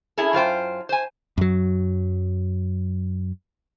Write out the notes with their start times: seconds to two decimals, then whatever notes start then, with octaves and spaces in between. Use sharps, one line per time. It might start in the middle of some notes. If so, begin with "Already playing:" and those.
0.18 C#4 E4 G#4 A4
0.33 F#2 F4 C5 G5
0.89 C5 G#5
1.38 F#2 F#3